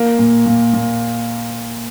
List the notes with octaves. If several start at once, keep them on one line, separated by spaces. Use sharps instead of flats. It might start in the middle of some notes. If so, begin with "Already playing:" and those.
Already playing: A#3
A#2
A#2
A#2